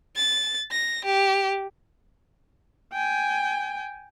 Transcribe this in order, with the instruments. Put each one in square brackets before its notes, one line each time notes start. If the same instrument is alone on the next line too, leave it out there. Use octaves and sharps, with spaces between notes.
[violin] A6
A#6
G4
[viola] G5 G#5